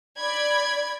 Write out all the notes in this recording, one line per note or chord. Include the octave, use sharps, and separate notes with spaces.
D5 B5 G#6